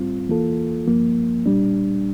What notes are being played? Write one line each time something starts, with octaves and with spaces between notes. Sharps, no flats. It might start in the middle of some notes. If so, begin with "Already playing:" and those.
Already playing: A2 G3 C4 F4
E2 E3 A#3 F4 A4
G2 F3 A#3
A#2 G3 D4